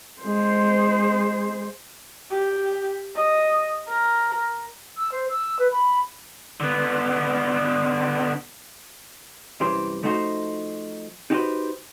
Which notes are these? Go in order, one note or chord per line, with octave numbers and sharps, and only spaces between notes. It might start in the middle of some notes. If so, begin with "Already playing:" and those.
G#3 C5
G4
D#5
A#4
E6
C5
E6
B4
B5
D3 B3
C2 F#2 E3 G4 C5 C6
F3 A3 D#4 F#4 A4 C5
D#4 F#4 G4 A4 B4 C5